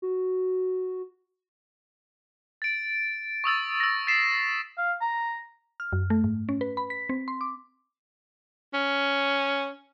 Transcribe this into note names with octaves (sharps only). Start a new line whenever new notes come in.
F#4
A6 D7
C#6 D#6 E6 A6
E6 A#6
A6 B6 C7 E7
F5
A#5
F6
F#2
A3
G#2
C#4
B4
B5
B6
C4
C6
D6
C#4